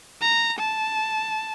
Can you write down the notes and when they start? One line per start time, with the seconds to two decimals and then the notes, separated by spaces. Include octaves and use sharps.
0.21 A#5
0.59 A5